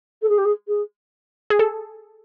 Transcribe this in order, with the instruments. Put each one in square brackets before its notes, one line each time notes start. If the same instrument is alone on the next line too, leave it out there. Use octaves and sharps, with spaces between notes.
[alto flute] A4
G#4
G4
G#4
G#4
[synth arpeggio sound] G#4
A4